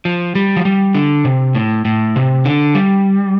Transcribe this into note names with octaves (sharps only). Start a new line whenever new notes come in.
F3
G3
F3
G3
D3
C3
A2
A2
C3
D3
G3